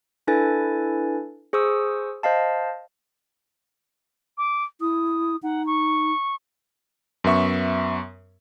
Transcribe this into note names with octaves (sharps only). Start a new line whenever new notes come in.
D4 E4 A4 B4 G#5 A6
G#4 C5 C#6 D#6 E6
C5 D#5 F5 A5
D6
E4 D#6
D#4 F#5
C#6
F#2 B3 E5 C#6